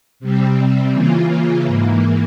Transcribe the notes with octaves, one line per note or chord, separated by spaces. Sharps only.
C3 G3 C4
C#3 E3 A#3 F4
G#2 E3 A#3